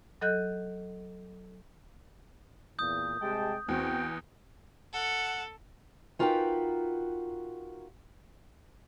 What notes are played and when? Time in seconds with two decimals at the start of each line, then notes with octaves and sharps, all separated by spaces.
0.21 F#3 A4 D#5 F#6 G6
2.79 E2 A#2 D#6 G6
3.21 C3 G3 G#3 G4 G5 A5
3.68 E2 C4 F#4 G5
4.94 A4 F#5
6.19 D#4 F4 F#4 A#4 B4 G5